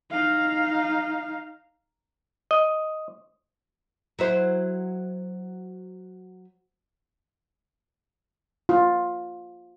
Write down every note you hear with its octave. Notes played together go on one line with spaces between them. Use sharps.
D#4 F5
D#5
F#3 E4 C5
F4